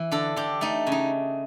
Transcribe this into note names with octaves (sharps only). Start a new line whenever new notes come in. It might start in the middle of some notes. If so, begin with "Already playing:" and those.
Already playing: E3
D3 A4
D3 G4
A3 D#4
C#3
D#4